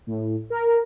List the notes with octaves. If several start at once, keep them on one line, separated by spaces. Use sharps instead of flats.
A2
A#4